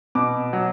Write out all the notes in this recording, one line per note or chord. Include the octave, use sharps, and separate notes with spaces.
B2 D6
F#3